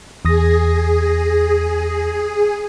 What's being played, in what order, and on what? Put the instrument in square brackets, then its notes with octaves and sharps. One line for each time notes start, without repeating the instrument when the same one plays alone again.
[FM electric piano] E2 D#6 A#6 [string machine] G#4